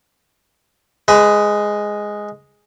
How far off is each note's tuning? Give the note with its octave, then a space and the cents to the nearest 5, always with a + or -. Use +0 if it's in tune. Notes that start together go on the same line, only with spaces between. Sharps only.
G#3 +0 B4 +20